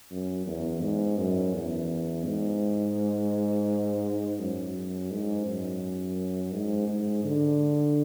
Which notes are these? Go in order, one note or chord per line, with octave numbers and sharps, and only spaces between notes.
F#2
E2
G#2
F#2
E2
G#2
F#2
G#2
F#2
G#2
G#2
D3